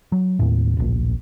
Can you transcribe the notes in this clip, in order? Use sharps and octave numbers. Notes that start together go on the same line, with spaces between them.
F#3
D#2 A2
D1 A#1